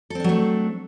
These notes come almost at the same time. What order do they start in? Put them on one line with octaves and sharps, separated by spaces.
A4 C4 D4 F#3 A3